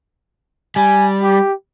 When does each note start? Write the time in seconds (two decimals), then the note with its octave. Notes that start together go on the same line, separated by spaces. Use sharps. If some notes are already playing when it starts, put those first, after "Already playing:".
0.76 G3 G#5
1.23 G4